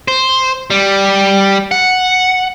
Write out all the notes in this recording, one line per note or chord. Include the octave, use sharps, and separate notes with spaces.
C5
G3
F#5